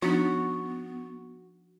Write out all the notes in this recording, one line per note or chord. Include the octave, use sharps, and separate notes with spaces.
F3 B3 D4 D#4 F#4